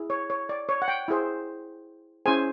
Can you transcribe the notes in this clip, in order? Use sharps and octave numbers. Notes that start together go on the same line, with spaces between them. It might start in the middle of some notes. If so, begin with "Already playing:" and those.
Already playing: E4 G#4
C#5
C#5
D5
C#5
F#5
G5
E4 G#4 C5
C#4 E4 G#4 C5 G#5